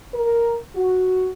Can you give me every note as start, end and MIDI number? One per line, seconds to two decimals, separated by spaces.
0.14 0.57 70
0.76 1.29 66